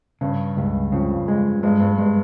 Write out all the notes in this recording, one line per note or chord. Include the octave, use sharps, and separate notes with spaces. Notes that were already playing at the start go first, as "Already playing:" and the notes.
G2 C#3
C#2 G2
F2 C#3
G#3
G2 G#3
G2
G2 G#3